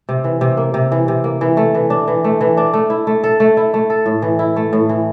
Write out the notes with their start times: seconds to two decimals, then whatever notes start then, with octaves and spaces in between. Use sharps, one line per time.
0.09 C3
0.24 E3
0.41 C3
0.57 A#3
0.74 C3
0.92 E3
1.08 C3
1.24 A#3
1.41 E3
1.57 A3
1.75 E3
1.90 D4
2.08 E3
2.24 A3
2.41 E3
2.57 D4
2.73 A3
2.90 E4
3.07 A3
3.24 A4
3.40 A3
3.57 E4
3.74 A3
3.90 A4
4.06 A2
4.22 E3
4.39 E4
4.56 A3
4.73 A2
4.89 E3